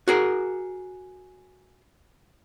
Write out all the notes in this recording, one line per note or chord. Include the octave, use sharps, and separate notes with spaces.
F#4 G#4 A#4